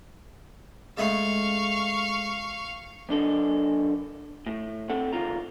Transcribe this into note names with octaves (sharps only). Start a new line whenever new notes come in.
C#3 G#3 A3 F5 C#6
F#2 D4 A4 D#5
A2
C4 A4 F#5
C#2 G#2 D#3 F4 A#5